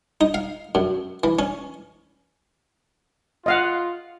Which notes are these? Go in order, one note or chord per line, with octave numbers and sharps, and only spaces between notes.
D#4
F5
F#2
E3
C#4
F4 D#5 F5 F#5